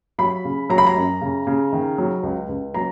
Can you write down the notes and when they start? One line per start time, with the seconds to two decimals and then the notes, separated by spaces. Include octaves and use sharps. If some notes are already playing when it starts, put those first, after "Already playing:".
0.18 F#3 B5
0.45 C#3
0.70 F#3 A#5
0.78 B5
0.87 A#5
0.96 F#2
1.21 C#3
1.47 C#3
1.73 D#3
1.98 F#3
2.23 C#2
2.49 C#2
2.74 F#3 A#5